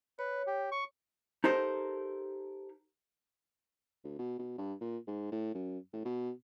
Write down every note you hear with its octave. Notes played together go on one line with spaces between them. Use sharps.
B4 C#5
G4
C#6
D#4 G4 A4 A#4 C5
D2
B2
B2
G2
A#2
G#2
A2
F#2
A2
B2